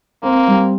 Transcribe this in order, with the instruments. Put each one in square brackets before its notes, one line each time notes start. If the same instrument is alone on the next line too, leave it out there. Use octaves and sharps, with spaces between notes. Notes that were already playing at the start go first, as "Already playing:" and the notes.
[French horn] A#3 [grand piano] C4
[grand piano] G3